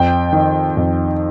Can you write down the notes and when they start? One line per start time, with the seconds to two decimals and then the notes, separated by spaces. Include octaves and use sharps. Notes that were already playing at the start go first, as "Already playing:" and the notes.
Already playing: F2 G5
0.33 D#3
0.77 F2